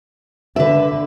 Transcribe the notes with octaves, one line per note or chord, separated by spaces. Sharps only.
D3 B4 E5